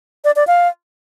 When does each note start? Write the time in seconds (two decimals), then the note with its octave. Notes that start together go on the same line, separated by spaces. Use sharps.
0.25 D5
0.36 D5
0.47 F5